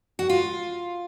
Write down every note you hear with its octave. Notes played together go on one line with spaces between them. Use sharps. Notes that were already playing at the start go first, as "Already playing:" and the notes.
F#4
F4